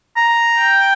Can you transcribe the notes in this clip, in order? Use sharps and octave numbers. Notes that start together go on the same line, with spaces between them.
A#5
G5